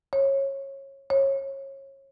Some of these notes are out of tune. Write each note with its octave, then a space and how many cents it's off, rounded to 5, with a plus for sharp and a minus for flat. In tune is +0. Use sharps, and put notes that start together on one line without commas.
C#5 -20
C#5 -25